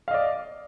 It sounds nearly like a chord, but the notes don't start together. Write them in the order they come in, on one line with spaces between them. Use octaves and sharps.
F5 D#5 D5